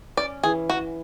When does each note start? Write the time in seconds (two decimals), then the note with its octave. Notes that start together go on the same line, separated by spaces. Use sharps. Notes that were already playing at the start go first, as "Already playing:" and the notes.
0.17 C#4 D5
0.43 E3 G#4
0.70 E3 F#4